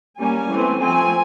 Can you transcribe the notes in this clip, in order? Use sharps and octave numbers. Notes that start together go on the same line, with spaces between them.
G3 A#3 C#4 G#5
E3 A3 C4
F3 A3 C4 G#5